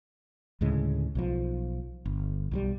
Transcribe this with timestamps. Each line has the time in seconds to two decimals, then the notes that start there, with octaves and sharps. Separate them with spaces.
0.61 D2 A2 C#3 G#3
1.15 B1 D#3 F3
2.05 G1
2.51 B1 D#3 G3